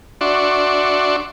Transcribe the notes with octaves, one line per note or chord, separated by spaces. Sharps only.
D4 F#4 D5 E5 C6 C#6